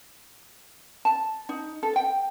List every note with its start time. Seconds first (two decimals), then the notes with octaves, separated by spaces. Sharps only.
1.05 A5
1.49 D#4
1.83 A4
1.96 G5